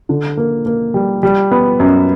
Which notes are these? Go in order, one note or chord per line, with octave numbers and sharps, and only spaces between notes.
D3
A#3
A#3
G3
G3
B3
F#2